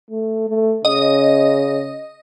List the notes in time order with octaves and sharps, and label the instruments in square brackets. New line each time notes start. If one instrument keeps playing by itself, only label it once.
[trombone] A3
A3
[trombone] C#3 [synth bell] D#5